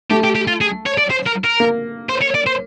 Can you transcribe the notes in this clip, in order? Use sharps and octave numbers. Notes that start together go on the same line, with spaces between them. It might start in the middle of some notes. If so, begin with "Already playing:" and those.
A3 G4
G4
G4
F4
G#4
C#5
D5
C5
A#4
A#4
A#3
C5
C#5
D5
C5